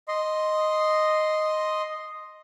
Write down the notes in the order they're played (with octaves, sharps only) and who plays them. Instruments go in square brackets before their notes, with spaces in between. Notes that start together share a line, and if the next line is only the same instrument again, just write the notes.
[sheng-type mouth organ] D#5 C6